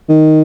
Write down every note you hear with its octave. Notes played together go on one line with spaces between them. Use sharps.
D#3